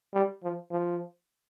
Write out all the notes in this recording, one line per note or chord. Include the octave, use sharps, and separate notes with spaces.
G3
F3
F3